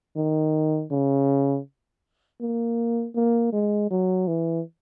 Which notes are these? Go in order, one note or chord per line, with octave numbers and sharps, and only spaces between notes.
D#3
C#3
A#3
A#3
G#3
F#3
E3